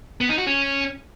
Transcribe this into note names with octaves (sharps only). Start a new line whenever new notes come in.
B3
D#4
F#4
C#4